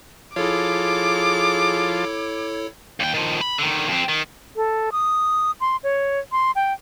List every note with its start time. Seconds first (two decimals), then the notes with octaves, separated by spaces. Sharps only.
0.36 F3 E4 F4 G#4 A4 C#5 A5 D6
3.00 D#2 G5
3.14 D#3 F3
3.41 B5
3.59 D3 D#3
3.88 F2 C4
4.09 D#3
4.56 A4
4.92 D#6
5.60 C6
5.84 C#5
6.32 C6
6.55 G5